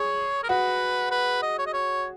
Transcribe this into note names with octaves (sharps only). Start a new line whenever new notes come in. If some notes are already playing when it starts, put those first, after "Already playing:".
Already playing: G#4 C#5
A#4
F#4 B4
B4
D#5
C#5
D#5
C#5